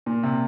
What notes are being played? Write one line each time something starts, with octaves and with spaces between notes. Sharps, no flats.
A#2
C3